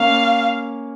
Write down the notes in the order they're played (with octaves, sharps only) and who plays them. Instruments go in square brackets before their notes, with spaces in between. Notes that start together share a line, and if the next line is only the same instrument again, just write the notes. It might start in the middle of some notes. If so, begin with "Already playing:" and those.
Already playing: [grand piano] A#3 C#4 [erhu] F5